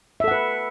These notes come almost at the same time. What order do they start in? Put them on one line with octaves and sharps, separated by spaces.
E5 A4 F#5 B4